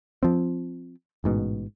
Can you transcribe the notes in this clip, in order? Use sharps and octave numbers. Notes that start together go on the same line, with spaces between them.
F3 C4
A1 G#2 B2